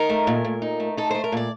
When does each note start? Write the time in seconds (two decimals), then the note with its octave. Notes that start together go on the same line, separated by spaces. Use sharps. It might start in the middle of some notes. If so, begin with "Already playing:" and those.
Already playing: D#4 A#4
0.09 A3
0.27 A#2
0.45 A#2
0.62 D#4
0.80 A3
0.97 D#4 A4
1.11 A3 C5
1.24 A#4
1.32 A#2 D5